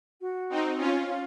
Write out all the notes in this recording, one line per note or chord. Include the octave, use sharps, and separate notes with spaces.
F#4
C4 D#4
C#4 F4
F4